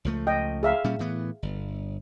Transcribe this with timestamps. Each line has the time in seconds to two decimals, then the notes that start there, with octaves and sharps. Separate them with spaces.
0.05 C#2 F3 A3
0.27 D#5 G5
0.63 G#4 E5 F5
0.84 A#2 G3 C#4
0.99 A2 E3 B3
1.43 G1